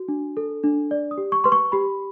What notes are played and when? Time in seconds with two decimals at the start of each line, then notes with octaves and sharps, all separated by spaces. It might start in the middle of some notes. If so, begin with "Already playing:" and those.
Already playing: F#4
0.08 D4
0.37 A4
0.63 D4
0.91 D5
1.11 D#6
1.18 G4
1.32 C#6
1.44 B4 C6
1.52 C#6
1.72 G4 B5